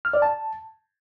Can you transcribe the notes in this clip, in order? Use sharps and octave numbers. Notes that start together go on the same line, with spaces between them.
F6
D5
A5